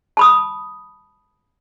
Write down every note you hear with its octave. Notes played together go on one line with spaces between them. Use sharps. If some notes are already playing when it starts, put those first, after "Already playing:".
A5 B5 D#6